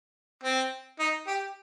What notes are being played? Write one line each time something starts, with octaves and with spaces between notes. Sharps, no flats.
C4
D#4
G4